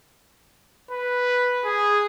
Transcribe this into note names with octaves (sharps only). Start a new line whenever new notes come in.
B4
G#4